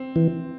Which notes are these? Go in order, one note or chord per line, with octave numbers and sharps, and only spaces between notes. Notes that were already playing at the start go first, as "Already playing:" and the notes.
Already playing: C4
E3